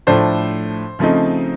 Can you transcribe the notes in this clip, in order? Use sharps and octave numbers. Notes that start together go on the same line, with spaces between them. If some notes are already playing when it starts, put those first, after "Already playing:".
A2 F3 A3 D4 C5
C#3 F3 A3 C4 D#4